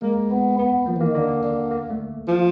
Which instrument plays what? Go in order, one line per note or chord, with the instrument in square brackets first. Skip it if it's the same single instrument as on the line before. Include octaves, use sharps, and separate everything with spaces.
[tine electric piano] G#3 [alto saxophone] A#3
[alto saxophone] B3
B3
[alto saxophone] F3 [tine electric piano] A#3
[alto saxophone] E3
[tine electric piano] A#3
[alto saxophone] D#3
[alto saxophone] D3 [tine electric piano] A#3
[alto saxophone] D3
[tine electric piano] A#3
A3
[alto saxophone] F3